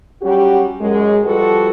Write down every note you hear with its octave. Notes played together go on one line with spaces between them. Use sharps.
F#3 G3 C#4 F#4 G4
F#2 G#3
F3 G3 F#4 A4 B4